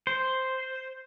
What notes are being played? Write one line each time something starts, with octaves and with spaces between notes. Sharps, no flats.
C5